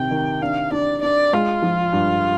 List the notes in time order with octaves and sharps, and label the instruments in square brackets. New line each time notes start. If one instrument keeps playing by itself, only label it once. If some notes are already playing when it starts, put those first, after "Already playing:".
Already playing: [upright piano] C3 D#3 [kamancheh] G5
[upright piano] D#3
[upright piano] D4 [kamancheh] F5
[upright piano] D4 [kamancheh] D5
[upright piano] D4 [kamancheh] D5
[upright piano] G#3 [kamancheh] F4
[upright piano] F3
G2